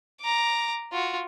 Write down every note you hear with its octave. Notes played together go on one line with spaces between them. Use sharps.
A#5 D6
F4 F#4